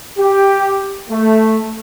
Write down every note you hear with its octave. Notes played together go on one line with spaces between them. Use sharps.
G4
A3